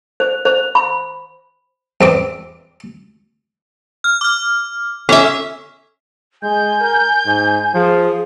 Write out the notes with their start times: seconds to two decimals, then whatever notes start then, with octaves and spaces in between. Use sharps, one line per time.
0.20 C5
0.45 C5
0.75 B5
2.01 E2 C4 D6
4.04 F6
4.21 D6 F6
5.09 C#4 A4 E5
6.42 G#3 G#5 G6
6.81 A#4
7.26 G#2
7.74 F3 G#4